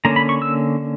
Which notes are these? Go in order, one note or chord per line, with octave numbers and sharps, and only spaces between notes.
D3 A#3 C#4 A#5
B5
C#6
E6